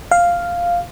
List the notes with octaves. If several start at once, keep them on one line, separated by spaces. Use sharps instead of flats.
F5